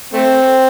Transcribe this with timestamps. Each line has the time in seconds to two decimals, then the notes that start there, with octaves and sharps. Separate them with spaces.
0.13 A3 C4